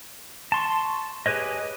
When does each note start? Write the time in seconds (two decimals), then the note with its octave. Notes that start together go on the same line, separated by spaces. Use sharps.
0.52 A5 C6 C#6
1.26 G4 G#4 B4 C#5 D#5